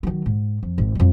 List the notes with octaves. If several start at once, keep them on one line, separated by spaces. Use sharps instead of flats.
D#3 F#3
G#2
F2
G#1
F2 G3